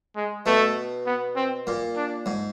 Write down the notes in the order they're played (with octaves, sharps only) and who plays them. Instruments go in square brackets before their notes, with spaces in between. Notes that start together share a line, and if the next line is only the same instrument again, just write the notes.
[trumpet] G#3
[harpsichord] B2 [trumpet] A3
[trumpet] B3
C4
[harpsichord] A#2
[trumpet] D4
[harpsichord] G#2